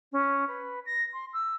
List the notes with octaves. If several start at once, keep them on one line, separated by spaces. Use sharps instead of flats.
C#4
B4
A#6
C6
E6